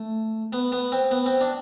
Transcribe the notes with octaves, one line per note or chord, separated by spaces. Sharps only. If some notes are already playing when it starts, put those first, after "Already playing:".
Already playing: A3
B3
B3
C4
B3
C4
D4